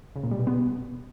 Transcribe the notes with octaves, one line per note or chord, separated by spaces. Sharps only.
C#3
A#2
G3
B2
B3